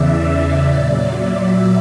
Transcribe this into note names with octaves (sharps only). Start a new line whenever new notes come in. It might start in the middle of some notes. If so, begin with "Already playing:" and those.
Already playing: E2 C#3 E3 D5 E5
D5
A#2 F#3
E5